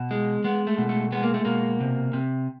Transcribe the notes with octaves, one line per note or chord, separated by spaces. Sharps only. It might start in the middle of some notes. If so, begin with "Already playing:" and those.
Already playing: B2
G#3
G#3 B3
A3
B2
A3
G#3 B3
A#3
A3
B2 A#3
C3
C3